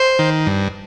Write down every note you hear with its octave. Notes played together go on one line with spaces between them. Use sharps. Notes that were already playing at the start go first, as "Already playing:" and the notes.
Already playing: C5
D#3
G2